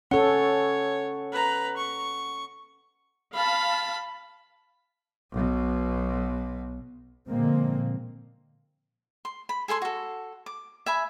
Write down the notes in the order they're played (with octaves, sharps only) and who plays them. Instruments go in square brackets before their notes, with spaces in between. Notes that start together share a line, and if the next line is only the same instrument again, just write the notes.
[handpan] C#4 A4 [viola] C#5 [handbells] F#5
[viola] B4 A#5
C#6
[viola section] F5 A5 [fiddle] B5
[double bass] B1 B2
[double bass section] A#2 D3 F3 G#3 A#3 C4
[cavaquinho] C6
B5
G#4 A4 G#5 C6
F#4 A4
D6
E5 G#5 B5